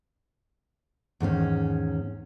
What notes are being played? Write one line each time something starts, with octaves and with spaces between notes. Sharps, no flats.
E2 G#2 D#3 C#4